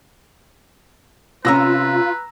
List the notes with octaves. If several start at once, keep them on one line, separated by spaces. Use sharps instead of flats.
C3 C#4 F4 B4 A#5 E6 A#6